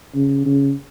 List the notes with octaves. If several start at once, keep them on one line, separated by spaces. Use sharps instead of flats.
C#3
C#3